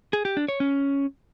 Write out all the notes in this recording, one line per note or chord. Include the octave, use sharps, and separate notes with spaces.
G#4
G4
D4
C#5
C#4